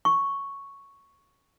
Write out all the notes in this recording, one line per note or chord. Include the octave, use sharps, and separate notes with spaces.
C#6